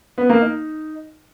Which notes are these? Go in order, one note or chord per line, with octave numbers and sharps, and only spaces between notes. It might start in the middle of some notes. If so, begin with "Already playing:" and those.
B3
A#3
D#4